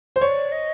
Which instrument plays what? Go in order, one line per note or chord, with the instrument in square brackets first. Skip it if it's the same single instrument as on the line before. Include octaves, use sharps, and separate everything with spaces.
[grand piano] C5
[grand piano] C#5 [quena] D5
[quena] D#5